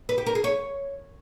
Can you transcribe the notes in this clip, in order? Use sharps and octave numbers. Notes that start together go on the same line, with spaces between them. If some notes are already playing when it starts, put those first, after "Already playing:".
B4
G4
A#4
G#4
C#5